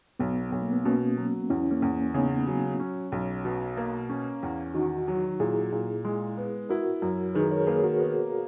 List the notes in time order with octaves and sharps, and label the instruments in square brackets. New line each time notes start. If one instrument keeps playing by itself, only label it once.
[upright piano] B1 [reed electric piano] B3
[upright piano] B1
[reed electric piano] A#3
B3
[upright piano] B2 [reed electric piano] A#3 C#4
[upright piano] F#3
[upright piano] E2 [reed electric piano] C#4 E4
[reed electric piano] A#3 C#4
[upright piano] E2
[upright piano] C#3 [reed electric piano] B3 D#4
[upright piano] F#3
C#4
B1
B2
A#3
C#4
E2
[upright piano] D#3 [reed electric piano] D#4 F#4
[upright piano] F#3
[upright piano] A#2 [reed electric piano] E4 G#4
[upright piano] A#2
G#3
B3
[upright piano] E4 [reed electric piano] F#4 A#4
[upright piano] F#2
[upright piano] D#3 [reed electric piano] G#4 B4
[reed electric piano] A#4 C#5
[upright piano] A#3 [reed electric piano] G#4 B4
[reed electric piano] F#4 A#4
[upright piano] B3